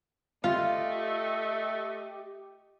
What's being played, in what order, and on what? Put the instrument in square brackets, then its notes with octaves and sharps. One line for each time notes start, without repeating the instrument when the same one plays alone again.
[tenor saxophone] A3 [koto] F4 [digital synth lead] G4 [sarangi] D#5